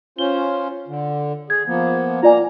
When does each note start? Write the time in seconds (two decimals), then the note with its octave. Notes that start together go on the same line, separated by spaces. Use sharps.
0.19 C#4 F4 C5 G7
0.88 D3
1.50 G#4 G#6
1.67 F3 A#3 B3
2.23 A#3 F4 D5 G#5 A#5